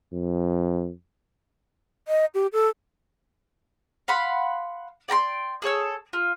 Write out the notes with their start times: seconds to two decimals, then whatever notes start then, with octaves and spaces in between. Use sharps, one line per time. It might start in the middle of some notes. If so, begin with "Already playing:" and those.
0.13 F2
2.08 D#5
2.34 G4
2.53 A4
4.08 F5 F#5 B5 C6
5.08 D5 G5 A#5 C6
5.62 G#4 A4 C#5 E6
6.13 F4